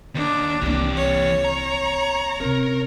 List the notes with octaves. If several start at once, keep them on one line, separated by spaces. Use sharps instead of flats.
D#2 D4
C2 E3 A#3 G4
C#5
A#5
C3 C#4 A#4